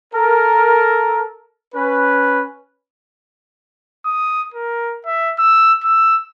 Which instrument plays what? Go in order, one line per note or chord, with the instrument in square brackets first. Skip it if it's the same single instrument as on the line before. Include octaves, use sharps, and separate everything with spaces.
[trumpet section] A4 A#4
C#4 B4
[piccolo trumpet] D#6
A#4
E5
E6
E6